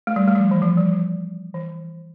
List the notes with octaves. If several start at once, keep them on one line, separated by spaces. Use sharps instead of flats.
A3
G3
A3
G3
F3
E3
F3
G3
F3
E3